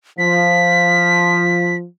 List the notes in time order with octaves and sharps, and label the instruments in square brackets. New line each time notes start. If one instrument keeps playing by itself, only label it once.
[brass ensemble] F3 [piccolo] B6